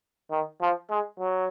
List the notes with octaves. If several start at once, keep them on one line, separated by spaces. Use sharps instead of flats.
D#3
F3
G#3
F#3